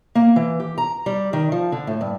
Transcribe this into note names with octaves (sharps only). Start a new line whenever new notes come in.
A#3
E3
G4
A#5
G3
D#3
F3
D3
A2
G2